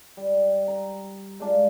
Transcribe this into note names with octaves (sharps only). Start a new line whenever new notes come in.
G3
A#5
G#3 D4 F4